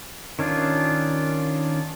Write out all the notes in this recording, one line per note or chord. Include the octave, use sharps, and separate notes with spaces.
D#3 C#4 D4 F4